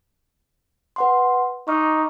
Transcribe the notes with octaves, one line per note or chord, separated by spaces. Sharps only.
B4 F#5 C6
D#4 C#6 D6 F6